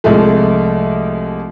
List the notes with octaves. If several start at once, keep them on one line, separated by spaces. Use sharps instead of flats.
C2 F3 G#3 A3